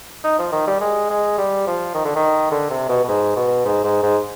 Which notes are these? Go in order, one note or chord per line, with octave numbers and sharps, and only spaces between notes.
D#4
F3
D#3
G3
G#3
G#3
G3
F3
D#3
D3
D#3
D3
C3
B2
B2
G#2
B2
G#2
G#2
G#2